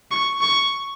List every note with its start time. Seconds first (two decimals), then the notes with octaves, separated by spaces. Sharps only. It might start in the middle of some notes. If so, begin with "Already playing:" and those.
0.11 C#6
0.41 C#6